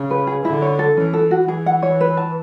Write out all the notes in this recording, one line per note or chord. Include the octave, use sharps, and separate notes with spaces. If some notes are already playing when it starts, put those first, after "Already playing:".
Already playing: C#3
B4
G#4
D3 E4
C#5
A4
E3 C#4
A4
F#4
E3 G#4
F#5
C#5
B4
A5